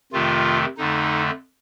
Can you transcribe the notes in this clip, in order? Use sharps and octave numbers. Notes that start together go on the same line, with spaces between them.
F2 C3 D#3 A3 F4
F2 D3 A3 D#4